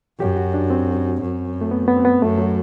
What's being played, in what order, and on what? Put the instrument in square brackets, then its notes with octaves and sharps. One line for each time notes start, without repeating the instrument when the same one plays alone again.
[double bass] F#2 [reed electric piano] G4
[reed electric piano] F#4
D4
C4
[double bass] F#2
[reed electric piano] A3
B3
B3
C4
B3
[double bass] F#2 [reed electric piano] A3
[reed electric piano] F#3